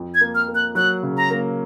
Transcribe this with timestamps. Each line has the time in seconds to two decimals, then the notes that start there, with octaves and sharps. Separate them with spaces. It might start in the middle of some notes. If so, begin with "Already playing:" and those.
Already playing: F2
0.15 G#6
0.21 A#3
0.35 F6
0.48 A#3
0.55 F#6
0.75 F#3 F#6
1.03 C#3
1.17 A#5
1.30 A#3